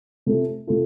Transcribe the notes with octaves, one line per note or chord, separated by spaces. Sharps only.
C3 A3 F4 A4
C3 A3 F4 A4